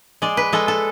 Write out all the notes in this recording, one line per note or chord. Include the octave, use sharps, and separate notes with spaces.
G#3 D5
B4
G#3 A4
A4